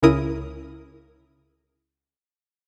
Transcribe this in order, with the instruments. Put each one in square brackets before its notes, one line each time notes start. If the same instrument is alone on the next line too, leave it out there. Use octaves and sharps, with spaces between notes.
[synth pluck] C#2 C#3 E4 A#4 D#6